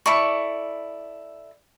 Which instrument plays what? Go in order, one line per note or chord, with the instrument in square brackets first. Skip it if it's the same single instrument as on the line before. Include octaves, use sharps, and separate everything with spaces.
[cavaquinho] E4 A4 D5 C#6